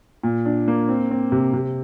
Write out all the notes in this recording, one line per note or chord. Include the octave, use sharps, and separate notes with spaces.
A#2
D4
A#3
C4
C4
C3
C3